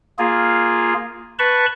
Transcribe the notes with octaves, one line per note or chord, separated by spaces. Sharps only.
A#3 F4 G#4
B4 A5 B5 C#6